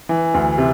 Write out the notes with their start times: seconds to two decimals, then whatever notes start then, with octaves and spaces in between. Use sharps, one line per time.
0.09 E3
0.34 D2
0.58 C3